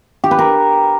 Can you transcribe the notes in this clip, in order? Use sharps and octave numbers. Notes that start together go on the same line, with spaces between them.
G4
B4
A#4